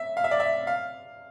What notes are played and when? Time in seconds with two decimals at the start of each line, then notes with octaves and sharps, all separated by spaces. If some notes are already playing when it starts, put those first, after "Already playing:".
Already playing: E5
0.17 F5
0.24 E5
0.31 D5
0.40 E5
0.67 F5